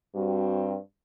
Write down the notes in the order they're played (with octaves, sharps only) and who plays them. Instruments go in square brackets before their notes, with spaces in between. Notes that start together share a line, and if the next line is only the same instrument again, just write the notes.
[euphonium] G2 [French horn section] G3 C4 F#4